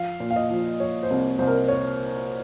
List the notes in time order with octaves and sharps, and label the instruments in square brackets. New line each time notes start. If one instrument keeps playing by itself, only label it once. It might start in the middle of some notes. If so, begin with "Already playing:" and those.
Already playing: [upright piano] F3 F5
A#2
F5
D#5
F3
F3 C#5
C5
C2
C2 C5
A#4
C#5